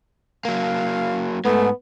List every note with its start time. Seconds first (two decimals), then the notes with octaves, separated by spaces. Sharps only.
0.45 F#3 A#3 F5
1.45 G#2 A3 B3